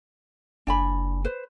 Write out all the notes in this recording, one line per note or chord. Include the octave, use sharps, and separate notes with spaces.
F#1 D4 G#5 B5
B4 C5